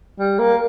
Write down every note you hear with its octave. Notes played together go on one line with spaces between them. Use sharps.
G3
A#3